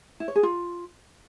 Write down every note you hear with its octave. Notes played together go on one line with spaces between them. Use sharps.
E4
C#5
G#4
F4